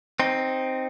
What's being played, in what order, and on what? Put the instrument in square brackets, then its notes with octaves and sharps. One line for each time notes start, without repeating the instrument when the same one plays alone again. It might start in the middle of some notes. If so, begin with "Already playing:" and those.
[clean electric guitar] C4 D#4